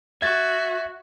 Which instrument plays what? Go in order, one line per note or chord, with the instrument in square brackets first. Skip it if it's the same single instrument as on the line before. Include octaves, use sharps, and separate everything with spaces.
[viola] F#4 [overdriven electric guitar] E5 [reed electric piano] G#6 A6